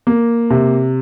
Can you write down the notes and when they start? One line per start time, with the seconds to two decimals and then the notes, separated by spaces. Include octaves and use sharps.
0.07 A#3
0.50 C3